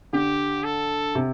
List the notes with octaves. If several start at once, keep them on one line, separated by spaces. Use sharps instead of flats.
D3 G4
A4
C3